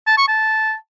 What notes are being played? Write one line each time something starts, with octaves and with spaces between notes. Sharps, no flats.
A5
C#6
A5